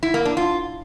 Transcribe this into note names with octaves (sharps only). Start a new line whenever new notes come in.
E4
A#3
D4
F4